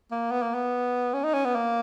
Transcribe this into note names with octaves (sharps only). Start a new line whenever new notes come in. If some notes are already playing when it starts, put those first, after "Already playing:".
A#3
B3
A#3
B3
C#4
D#4
C#4
B3
A#3